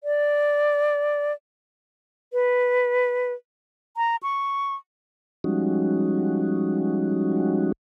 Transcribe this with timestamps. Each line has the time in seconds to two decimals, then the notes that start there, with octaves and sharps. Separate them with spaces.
0.04 D5
2.32 B4
3.97 A#5
4.23 C#6
5.44 F3 G3 G#3 C#4 D#4 F#4